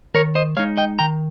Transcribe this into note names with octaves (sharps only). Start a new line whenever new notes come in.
D#3 A#4 C#5
C5 D#5
G#3 D#4 C#5 F5
D#5 G5
D#3 G5 A#5